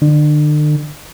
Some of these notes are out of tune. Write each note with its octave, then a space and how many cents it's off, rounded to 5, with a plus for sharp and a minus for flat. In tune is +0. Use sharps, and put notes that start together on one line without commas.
D3 +40